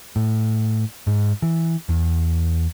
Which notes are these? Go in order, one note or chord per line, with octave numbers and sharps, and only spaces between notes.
A2
G#2
E3
E2